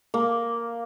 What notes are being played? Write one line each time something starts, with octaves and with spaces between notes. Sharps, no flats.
A#3